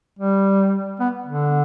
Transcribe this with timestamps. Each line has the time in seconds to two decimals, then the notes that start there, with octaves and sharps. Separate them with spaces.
0.19 G3
1.00 B3
1.26 D3